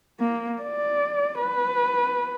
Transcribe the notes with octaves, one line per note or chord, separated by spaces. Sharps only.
A#3
D5
B4